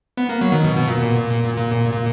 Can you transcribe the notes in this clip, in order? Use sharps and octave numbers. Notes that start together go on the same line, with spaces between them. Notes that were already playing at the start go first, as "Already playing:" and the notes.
B3
A#3
F#3
D#3
B2
B2
A#2
A#2
A#2